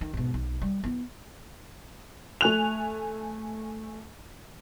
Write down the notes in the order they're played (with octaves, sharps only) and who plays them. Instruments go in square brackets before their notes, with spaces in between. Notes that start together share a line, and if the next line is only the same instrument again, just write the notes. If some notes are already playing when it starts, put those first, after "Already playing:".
[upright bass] D#3
G#2 B2
B1
G3
B3 E4
[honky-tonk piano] A3 G#5 F#6 F7